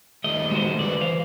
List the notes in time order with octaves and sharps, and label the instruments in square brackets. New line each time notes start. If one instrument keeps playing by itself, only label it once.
[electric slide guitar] D#3 G3 A3 [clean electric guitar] D#5
[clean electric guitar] G#3 F#4 C5
[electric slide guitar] D#3 F#4 B4 [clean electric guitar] D5
[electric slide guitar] E3 [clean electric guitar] C5 F5